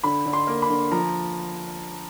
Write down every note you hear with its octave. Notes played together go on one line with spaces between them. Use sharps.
D3 B5
D3
C6
A#3
B5
D3
F3 A#5